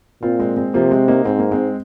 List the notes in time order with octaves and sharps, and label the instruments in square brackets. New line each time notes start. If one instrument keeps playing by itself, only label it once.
[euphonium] A#2 [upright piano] C4 F4
[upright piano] G#3 C4
G#3 C4
[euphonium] C3 [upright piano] F3 A#3
[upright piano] G#3 C4
A#3 D#4
[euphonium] G#2 [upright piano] C4
[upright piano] A#3
G#3 C4